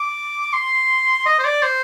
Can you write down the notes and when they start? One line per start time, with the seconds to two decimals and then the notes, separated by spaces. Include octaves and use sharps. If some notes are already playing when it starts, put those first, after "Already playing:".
Already playing: D6
0.53 C6
1.26 D#5
1.39 C5
1.45 D5
1.63 C5